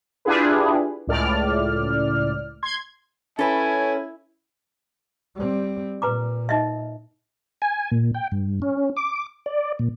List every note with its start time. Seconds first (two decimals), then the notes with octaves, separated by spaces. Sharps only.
0.25 D4 E4 F4 G4 G#4 B4
1.07 C#2 A2 D5 F6
2.63 C6 G#6
3.39 C#4 E4 A4 B4 G#5
5.36 G3 C4
6.02 A#2 B4 A#5 D6
6.49 D#4 D#5 E5
7.62 G#5
7.91 A#2
8.14 G5
8.32 G2
8.62 C#4
8.97 D6
9.46 D5
9.79 A#2